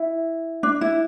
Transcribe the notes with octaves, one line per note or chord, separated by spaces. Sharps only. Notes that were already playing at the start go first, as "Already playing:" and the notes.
Already playing: E4
D4
E4